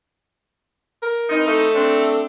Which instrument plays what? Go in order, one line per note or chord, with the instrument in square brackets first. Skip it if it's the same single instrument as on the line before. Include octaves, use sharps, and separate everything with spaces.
[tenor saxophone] A#4
[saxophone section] E3 C4 D#4
[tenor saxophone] A3
[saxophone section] C4 D4